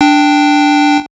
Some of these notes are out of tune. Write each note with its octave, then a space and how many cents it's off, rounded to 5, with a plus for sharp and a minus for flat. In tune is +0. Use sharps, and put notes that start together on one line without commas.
D4 +0 G5 +0